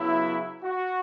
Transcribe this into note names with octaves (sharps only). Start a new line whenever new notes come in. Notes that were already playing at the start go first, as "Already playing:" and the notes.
Already playing: C#3 F#3 B3 E4
F#4